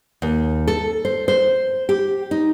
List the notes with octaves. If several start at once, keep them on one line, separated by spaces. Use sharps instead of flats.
D#2
A4
C5
C5
G4
D#4